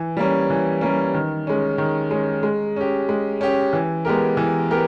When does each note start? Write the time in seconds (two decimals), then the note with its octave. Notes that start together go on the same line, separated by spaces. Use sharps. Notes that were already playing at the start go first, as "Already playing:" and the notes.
Already playing: E3
0.17 G3 A#3 C#4
0.50 E3
0.81 G3 A#3 C#4
1.14 D#3
1.47 G#3 C#4
1.78 D#3
2.11 G#3 C#4
2.43 G#3
2.76 C#4 G4
3.09 G#3
3.41 C#4 G4
3.73 E3
4.05 G#3 B3 G4 A#4
4.37 E3
4.71 B3 G4 A#4